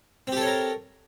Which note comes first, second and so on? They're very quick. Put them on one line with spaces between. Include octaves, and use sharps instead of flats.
C4 G4 A4 C#5 A#4